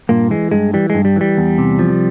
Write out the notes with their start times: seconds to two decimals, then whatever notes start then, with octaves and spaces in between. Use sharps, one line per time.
0.09 G2 A#2 A#3
0.31 E3 G#3
0.51 G2 G#3
0.74 E3 G3
0.90 G2 G#3
1.05 G3
1.16 E3 G3
1.37 E2
1.58 C3
1.79 F3